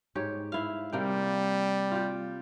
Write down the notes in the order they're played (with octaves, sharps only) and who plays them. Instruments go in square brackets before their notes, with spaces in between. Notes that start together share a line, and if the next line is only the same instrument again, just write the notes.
[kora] G#2 G4 C#5
E4 F5
[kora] C3 A#3 G5 [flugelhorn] G3
[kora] F4 G4